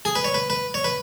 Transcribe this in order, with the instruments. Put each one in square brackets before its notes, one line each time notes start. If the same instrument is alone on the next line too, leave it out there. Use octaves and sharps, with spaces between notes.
[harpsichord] G#4
B4
C#5
B4
B4
C#5
B4